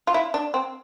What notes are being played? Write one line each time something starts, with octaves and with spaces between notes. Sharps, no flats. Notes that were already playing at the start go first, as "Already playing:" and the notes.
F4
E4
D4
C4